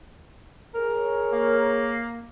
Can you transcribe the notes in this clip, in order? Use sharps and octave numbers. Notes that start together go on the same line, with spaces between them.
G#4 A#4 C#5
A#3